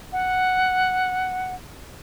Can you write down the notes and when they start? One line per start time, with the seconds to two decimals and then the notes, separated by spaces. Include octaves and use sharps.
0.13 F#5